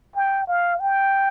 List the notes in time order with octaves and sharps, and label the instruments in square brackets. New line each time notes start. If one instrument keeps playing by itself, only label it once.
[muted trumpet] G5
F5
G5